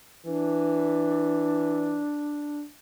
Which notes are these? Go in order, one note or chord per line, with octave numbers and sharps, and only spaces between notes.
E3 D4